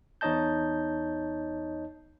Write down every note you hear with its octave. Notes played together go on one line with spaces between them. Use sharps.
E2 D#4 C#5 D#5 A5 G6